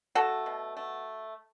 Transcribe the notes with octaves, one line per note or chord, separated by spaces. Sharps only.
A3 F#4 A4
B2
A3